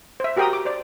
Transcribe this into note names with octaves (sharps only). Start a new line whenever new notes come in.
C5 E5
F#4 G4 A#4 G5 A#5 D#6
D6
C5 D5